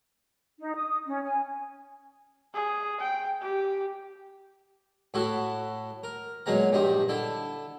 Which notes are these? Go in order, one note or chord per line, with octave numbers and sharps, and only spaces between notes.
D#4
D#6
C#4
G#5
G#4
G5
G4
A2 E4 F#4 A4
A#4
A#2 F#3 G#3 B3 A#5
A#1 G2 G3 D#4 C6
D3 E4 A4